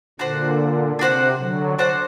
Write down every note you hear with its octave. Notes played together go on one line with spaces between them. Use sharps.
A#2 D3 D4 F#4 C5 F#5
C3 D4 F#4 C5 F#5
D3 F#3
D4 F#4 C5 F#5